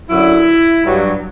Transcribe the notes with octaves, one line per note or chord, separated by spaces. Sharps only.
F#2 D3 F#3 E4
G2 F#3